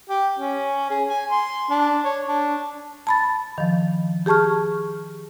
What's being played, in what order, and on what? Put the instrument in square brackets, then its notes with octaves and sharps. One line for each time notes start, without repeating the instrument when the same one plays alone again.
[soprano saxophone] G4
C#4
G#4
G#5
C6
D4
C#5
D4
[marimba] A5 B5 A6
D#3 F3
G4 G#4 A5 C#6 F6